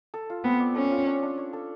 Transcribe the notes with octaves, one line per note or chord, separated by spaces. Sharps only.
A4
F4
B3 C4
D5
C#4 A4
F4
D4
D4
C#5
A4